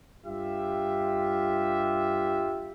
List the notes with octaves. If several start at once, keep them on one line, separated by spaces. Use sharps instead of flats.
G2 F4 G4 E5